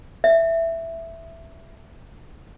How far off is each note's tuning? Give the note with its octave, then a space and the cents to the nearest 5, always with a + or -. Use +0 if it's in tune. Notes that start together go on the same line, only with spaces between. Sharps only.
E5 +5